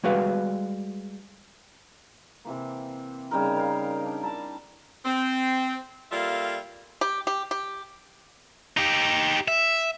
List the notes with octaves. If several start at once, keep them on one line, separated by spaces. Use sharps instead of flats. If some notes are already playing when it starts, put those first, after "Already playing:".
G3 G#3 F#4 G#4 B4 F5
C3 E3 A#3
C#3 G3 D#4 A#4
A#4 F5
D4
E4 A5 A#5
C4
G3 A#3 F4 A4 E5 F5
G4
G4
G4
D#4 G4
E5